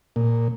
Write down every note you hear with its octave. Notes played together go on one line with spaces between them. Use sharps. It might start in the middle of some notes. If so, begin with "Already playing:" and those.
A#2